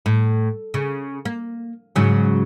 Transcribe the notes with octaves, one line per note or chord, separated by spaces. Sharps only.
A2
C#3
A#3
G#2 C#3 F#3